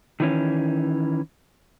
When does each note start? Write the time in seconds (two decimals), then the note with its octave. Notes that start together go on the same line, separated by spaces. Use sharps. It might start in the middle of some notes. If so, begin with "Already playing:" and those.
0.20 D#3 E3 C#4